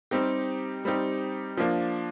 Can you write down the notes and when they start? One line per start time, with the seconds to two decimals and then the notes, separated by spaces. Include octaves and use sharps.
0.11 G3 C4 D#4 G4
0.85 G3 C4 D#4 G4
1.57 F3 A#3 D4